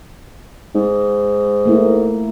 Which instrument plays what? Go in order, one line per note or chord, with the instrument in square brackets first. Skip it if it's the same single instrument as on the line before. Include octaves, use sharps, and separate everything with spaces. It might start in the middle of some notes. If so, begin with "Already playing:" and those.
[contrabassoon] G#2
[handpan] A3 A#3 E4